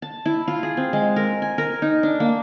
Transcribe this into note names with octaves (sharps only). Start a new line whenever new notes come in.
A5
E4
F4
G#4
C4
G#3
A#4
G#5
A#4
D#4
D4
A#3